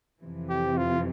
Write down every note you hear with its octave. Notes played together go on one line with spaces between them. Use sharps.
F2 C3 E3
G4
F4